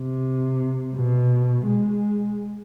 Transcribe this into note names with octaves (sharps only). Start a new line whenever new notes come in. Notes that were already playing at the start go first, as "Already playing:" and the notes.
Already playing: C3
B2
G#3